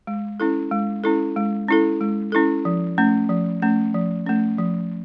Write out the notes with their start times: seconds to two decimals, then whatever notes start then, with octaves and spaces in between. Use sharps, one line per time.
0.07 G#3
0.40 C#4 E4 A4
0.71 G#3
1.04 C#4 E4 A4
1.36 G#3
1.68 C#4 E4 A4
2.01 G#3
2.32 C#4 E4 A4
2.65 F3
2.98 A3 C#4
3.29 F3
3.62 A3 C#4
3.94 F3
4.27 A3 C#4
4.58 F3